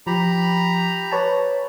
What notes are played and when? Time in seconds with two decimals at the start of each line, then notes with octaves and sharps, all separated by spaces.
0.07 F3 G4 A#5 B5
1.12 B4 C#5 A5